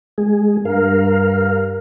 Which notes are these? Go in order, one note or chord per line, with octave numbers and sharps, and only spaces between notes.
G#3 G#4
G2 A#4 F5